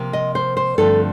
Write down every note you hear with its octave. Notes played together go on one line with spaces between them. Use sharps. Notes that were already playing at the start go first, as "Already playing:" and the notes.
Already playing: C3 F3 A#3
D#5
C5
C5
G2 D3 F3 A3 C4 A4